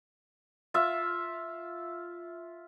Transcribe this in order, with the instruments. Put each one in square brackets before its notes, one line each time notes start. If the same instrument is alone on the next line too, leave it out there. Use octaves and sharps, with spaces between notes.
[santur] F4 E5